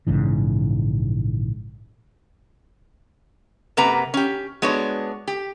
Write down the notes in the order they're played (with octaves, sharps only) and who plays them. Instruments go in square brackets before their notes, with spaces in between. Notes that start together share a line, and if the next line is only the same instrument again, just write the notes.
[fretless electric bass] A#1 G#2 C#3 E3
[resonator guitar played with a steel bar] F#2 C3 A#3 B4 F#5 A#5
C#4 G4
G#3 B3 D4 F#4 C#5
G4